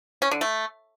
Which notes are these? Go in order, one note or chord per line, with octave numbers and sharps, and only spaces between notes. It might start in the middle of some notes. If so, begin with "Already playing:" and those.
C#4
D3
A3